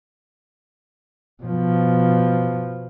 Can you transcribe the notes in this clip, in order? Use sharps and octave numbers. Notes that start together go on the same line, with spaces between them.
B2 F3